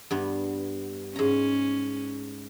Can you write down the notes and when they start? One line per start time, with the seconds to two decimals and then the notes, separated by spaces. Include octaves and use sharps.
0.11 G2 B3
1.16 G#2 C#4 A#5